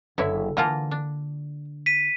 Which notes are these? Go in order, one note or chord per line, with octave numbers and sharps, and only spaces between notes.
F#1 D3 E4 B4 C#5 E5
D3 E3 A#3 F4 A4 F#5 A5
D4
B6 D#7